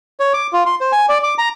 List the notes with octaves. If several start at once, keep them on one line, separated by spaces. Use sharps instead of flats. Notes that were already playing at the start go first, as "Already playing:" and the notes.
C#5
D6
F4
C6
C5
G#5
D5
D6
A#5